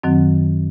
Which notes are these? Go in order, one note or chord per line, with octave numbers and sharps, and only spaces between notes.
F#2 D#3 F#3 C4